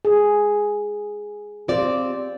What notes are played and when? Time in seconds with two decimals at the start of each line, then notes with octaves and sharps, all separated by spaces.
0.05 G#4
1.68 C4 F4 G4 D5